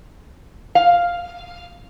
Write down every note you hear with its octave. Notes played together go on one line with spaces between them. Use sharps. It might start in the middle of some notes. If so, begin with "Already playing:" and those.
F5